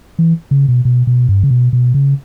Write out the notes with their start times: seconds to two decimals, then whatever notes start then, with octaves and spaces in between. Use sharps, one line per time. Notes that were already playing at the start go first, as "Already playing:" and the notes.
0.19 E3
0.51 C#3
0.68 B2
0.85 B2
1.07 B2
1.29 G2
1.43 C#3
1.51 B2
1.73 B2
1.94 C#3